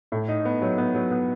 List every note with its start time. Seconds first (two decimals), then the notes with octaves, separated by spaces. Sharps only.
0.12 A2
0.28 D#4
0.45 B3
0.62 F#3
0.78 B3
0.94 F#3
1.11 B3